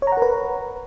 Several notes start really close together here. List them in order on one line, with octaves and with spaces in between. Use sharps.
C#5 A#5 F#5 A#4 B4